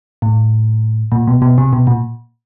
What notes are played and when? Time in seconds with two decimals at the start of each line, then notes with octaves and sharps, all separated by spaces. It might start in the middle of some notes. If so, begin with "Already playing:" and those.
0.22 A2
1.12 A#2
1.27 B2
1.42 B2
1.58 C3
1.73 B2
1.87 A#2